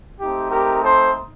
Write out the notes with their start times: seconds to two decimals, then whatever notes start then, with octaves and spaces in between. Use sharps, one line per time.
0.19 A3 C4 D#4 G4
0.51 G4 A#4
0.84 A4 C5